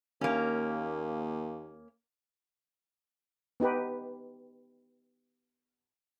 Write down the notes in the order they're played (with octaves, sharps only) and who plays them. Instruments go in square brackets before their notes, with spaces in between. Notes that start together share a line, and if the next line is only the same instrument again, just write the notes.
[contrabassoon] D#2 [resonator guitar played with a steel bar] A#3 C#4
[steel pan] B3 D#4 G4 B4